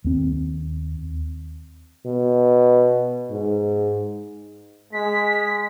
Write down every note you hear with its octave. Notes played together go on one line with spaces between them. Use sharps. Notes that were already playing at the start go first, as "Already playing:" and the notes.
D#2 C4
B2
G#2
G#3 B6